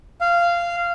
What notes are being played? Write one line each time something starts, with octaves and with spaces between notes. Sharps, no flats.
F5